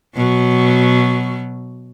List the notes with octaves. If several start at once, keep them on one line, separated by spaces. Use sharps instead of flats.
B2 F#3